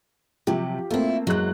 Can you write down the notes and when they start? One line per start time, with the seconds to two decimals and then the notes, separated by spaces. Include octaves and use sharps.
0.47 C3 F3 F#3 G4
0.91 A3 A#3 C4 E4 F4
1.27 F#1 E2 F#3 G#3 F#6